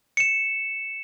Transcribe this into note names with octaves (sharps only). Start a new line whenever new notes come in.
C#7 E7